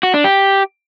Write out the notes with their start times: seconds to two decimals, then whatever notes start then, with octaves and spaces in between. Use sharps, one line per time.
0.03 F#4
0.14 D4
0.24 G4